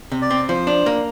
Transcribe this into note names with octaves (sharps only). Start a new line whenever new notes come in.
C3
D5
C4
F3 C5
D4
A#3